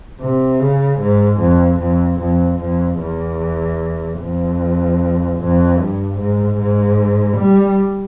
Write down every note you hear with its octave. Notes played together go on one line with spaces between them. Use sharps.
C3
C#3
G#2
F2
F2
F2
F2
E2
F2
F2
G2
G#2
G#2
G3